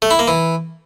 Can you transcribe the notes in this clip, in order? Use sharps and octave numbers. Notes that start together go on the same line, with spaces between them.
A3
E4
A#3
E3